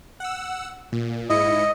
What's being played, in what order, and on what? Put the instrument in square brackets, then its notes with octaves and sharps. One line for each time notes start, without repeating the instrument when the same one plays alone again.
[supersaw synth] F#5 E6
A#2
[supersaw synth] G#2 E4 C#7 [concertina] D#5